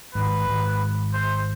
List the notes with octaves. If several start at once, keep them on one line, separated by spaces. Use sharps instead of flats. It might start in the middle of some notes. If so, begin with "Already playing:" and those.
G#1 G#2 B4
G#1 G#2
C5